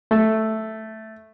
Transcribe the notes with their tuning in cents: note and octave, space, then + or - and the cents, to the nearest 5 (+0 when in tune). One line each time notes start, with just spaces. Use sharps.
A3 +0